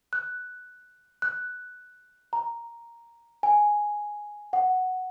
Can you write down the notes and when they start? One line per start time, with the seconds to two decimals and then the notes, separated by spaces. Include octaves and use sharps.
0.13 F#6
1.22 F#6
2.33 A#5
3.43 G#5
4.53 F#5